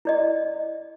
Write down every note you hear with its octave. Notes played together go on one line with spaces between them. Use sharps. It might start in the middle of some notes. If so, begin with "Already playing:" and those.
E4 D5 D#5